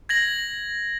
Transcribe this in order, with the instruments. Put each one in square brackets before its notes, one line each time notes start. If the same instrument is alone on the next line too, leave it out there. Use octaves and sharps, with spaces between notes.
[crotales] G#6 A#6 F#7